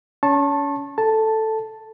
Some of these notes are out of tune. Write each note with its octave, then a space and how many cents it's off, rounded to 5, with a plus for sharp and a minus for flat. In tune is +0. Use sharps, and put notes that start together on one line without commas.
C#4 +30 A5 +0 C#6 -35
A4 +0 A5 +0